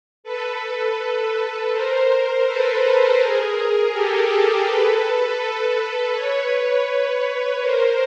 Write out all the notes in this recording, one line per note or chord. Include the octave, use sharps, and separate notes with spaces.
A4 B4
A#4 C5
A4 B4
G#4 A#4
G4 A4
A4 B4
B4 C#5
B4 C#5
A#4 C5